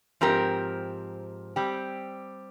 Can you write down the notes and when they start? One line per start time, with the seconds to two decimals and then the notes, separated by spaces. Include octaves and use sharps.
0.21 G#2 F3 C4 G4 A#4
1.56 G3 C4 G4